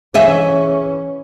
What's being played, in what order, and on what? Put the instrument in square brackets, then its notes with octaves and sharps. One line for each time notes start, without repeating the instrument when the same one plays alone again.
[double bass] E3 C#4 [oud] G#4 D#5 E5